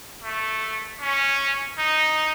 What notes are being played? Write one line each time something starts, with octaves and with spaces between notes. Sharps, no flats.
A3
C#4
D#4